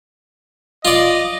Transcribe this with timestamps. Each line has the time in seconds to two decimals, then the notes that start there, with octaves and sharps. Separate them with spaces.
0.85 F4 D5 D#5